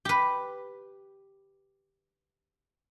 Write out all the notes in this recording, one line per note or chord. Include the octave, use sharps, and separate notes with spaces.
G4 B4